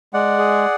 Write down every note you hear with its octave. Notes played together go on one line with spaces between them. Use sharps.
G#3 D5 F#5
G#4